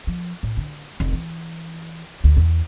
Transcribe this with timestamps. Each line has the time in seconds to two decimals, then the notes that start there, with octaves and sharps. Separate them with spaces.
0.07 F3
0.43 A2
0.57 D3
1.00 F1
1.13 E3
2.24 D2
2.37 E2